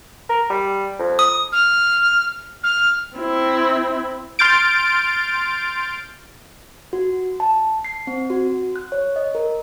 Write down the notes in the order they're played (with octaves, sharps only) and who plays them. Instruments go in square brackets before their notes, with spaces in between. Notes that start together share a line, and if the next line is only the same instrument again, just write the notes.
[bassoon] A#4
G3
F2
[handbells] D#6
[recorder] F6
F6
[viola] C4 E4
[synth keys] C6 F6 G6 A6 D7
[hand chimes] F#4
A5
C7
C4
F#4
F#6
C#5
D#5
A#4